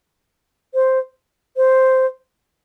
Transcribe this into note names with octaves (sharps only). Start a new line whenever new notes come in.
C5
C5